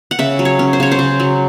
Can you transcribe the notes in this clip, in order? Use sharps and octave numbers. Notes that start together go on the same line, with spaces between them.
F#5
C#3 E5
F#3
C#5
C#4
C5
C#3 C#5
C5
C#3
F#3